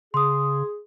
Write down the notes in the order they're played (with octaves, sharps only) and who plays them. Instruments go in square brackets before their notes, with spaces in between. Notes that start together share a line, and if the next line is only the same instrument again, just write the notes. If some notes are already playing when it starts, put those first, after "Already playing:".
[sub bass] C#3 [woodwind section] G#4 [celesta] C6 D#6